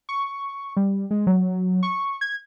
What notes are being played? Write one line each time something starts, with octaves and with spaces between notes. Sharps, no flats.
C#6
G3
G#3
F#3
C#6
G#6